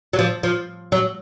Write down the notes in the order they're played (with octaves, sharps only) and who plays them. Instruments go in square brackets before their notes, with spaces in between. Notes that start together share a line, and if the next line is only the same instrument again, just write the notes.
[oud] F#3
F3
F3
F#3